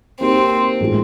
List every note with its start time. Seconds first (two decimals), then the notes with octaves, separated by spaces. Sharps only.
0.20 A#3 C4 D#4 G4
0.80 A2 E3 G#3 C#4 F4